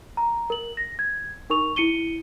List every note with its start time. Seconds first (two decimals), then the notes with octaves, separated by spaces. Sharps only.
0.17 A#5
0.50 A#4 F#7
0.77 A#6
0.99 G#6
1.50 D#4 A#4 C#6 F7
1.76 E4 C#7 D#7 G7